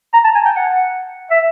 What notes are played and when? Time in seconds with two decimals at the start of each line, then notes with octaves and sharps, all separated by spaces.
0.14 A#5
0.24 A5
0.35 G#5
0.45 G5
0.56 F#5
1.31 E5